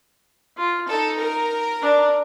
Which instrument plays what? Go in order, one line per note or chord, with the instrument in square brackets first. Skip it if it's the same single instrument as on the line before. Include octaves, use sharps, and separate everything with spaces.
[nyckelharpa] F4
[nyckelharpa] D#4 [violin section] A4
[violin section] A#4
[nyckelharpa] D4